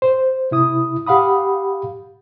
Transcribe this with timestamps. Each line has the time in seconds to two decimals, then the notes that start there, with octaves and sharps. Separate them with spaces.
0.02 C5
0.51 C3 E4 D#6
1.06 G4 F5 F#5 B5 D#6